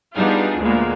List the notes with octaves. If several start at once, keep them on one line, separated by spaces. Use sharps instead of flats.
G3 B3 D4 D#4 F4 G#4
D2 A#2 G#3 A#3 B3